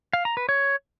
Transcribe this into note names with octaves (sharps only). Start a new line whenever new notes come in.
F5
A#5
B4
C#5